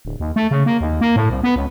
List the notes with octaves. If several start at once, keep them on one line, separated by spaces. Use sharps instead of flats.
D1
D#2
A3
C#3
A#3
D#2
A#3
A2
C2
B3
C#2